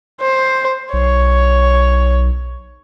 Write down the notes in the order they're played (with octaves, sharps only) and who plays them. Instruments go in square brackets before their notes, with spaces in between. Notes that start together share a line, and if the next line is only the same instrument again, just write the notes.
[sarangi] C5
[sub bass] B1 [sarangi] C#5